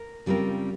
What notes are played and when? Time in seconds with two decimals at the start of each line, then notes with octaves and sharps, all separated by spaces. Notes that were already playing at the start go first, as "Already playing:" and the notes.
Already playing: A#4
0.26 C#3 G3 C4 F4 A#4